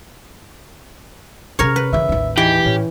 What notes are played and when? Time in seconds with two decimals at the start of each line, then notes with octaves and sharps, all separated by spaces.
1.59 C3 C#4 A#4 C#5
1.76 B4
1.93 C#3 E3 E5
2.09 A1 D#2
2.37 E3 D#4 G4
2.65 A2 C#4